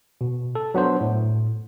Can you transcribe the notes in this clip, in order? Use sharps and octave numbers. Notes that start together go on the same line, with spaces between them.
B2
A4
F#3 B3 D4 C5
A2